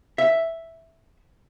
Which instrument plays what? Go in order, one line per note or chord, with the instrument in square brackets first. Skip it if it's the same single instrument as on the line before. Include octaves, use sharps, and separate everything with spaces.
[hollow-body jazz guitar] E5